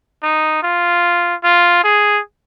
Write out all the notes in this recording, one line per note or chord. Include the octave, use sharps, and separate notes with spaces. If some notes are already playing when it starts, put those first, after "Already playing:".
D#4
F4
F4
G#4